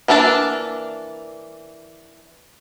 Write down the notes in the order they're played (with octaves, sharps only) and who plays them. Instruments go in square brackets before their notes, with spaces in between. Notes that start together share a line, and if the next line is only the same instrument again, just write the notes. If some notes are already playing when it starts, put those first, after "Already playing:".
[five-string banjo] E3 A#3 D4 F#4 A5